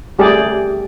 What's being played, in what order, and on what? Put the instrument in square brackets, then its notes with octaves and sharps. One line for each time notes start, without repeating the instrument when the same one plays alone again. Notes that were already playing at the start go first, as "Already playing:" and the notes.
[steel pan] G3 A3 G4 G#4 D5